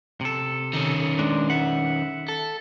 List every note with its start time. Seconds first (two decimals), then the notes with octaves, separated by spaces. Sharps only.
0.21 C3 A4
0.73 D#3 C#4
1.19 G#3 D4
1.50 E5 F#5
2.28 A4